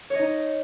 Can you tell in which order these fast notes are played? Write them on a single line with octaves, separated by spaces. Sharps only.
C#5 D#5 D#4